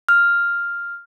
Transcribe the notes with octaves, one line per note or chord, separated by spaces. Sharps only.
F6